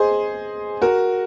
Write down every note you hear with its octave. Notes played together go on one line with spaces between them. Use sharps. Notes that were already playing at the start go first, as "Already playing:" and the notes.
Already playing: G#4 C5 D#5
F#4 A#4